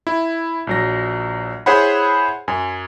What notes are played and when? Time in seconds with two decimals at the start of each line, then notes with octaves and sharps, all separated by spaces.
0.07 E4
0.67 A#1 F#3 A#6
1.66 E4 G#4 C5 C#5 F#5 B5
2.48 F#2 G#5